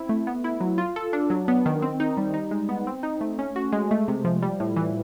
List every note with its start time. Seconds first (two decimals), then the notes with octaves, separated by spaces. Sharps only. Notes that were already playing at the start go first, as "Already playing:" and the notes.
Already playing: C4 E4
0.09 A3
0.27 B3
0.44 E4
0.60 F#3
0.78 F4
0.96 A4
1.13 D4
1.30 F#3
1.48 B3
1.66 D#3
1.82 C4
2.00 D#4
2.17 G3
2.34 D#4
2.51 G#3
2.69 B3
2.87 C4
3.03 D#4
3.21 A3
3.39 C#4
3.56 F#4
3.72 G#3
3.91 A3
4.08 C3
4.25 F3
4.42 G3
4.60 A2
4.76 E3